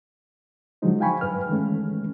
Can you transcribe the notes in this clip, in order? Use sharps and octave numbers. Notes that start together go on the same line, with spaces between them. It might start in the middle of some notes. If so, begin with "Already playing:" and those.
D3 F3 F#3 G#3 D#4 C5
F5 G5 G#5 B5 C#6
G2 B4 F6
D#3 E3 G#3 A3 C#4